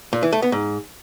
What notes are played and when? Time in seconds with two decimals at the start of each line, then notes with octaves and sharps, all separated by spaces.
0.13 A#2
0.23 E3
0.33 A3
0.42 B3
0.52 G#2